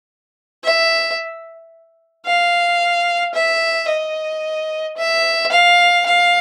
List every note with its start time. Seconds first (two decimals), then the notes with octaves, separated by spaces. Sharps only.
0.64 E5
2.26 F5
3.34 E5
3.88 D#5
4.97 E5
5.52 F5
6.06 F5